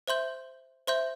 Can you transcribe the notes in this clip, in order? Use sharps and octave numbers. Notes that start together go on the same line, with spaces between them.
C5 E5 C6 G6
C5 E5 C6 G6